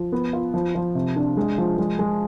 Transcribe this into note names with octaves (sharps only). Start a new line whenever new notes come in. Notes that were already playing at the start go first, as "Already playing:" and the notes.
Already playing: F3
B3
F4
F3
F3
C3
D4
G#3
F3
G#3
G#3